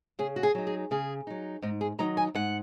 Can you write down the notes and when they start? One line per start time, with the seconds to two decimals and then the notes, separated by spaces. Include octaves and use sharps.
0.19 C#3 G#4
0.36 F#4
0.43 G#4
0.55 F#3 D#4
0.67 G#4
0.91 C#3 G#4
1.27 F#3 D#4
1.62 G#2 D#4
1.81 G#4
1.98 D#3 F#3 D#4 A#5
2.17 G#5
2.35 G#2 F#5